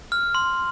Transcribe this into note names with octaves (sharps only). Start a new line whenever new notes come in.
F6
C6